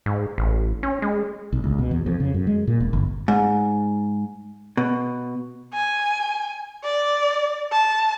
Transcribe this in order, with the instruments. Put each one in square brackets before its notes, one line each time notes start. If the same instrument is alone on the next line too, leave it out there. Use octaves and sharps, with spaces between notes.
[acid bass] G#2
A1
C#4
G#3
[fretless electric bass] B1
C#2
B2
E2
F2
C#3
F#2
G#3
A#2
E1
G1
[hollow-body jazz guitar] G#2
B2
[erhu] G#5
D5
A5